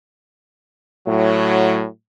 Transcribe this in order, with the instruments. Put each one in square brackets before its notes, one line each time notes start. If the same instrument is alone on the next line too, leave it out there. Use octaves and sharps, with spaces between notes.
[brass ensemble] A2 F#3